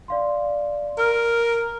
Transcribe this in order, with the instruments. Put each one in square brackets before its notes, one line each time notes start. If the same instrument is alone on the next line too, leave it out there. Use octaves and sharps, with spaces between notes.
[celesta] D5 F5 C6
[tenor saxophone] A#4 [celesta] F6